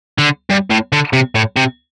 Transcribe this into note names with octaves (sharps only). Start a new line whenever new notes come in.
D3
G2
A2
D3
C3
A2
C3